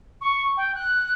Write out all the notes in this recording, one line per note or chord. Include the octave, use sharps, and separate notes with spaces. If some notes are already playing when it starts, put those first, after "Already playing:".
C#6
G5
F#6